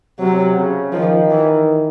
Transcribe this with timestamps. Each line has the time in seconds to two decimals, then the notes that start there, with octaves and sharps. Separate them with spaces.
0.19 C3 F#3
0.57 C#3
0.93 D#3 F3
1.30 E3